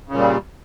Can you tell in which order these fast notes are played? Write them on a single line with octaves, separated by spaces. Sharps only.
C#3 A#2 G3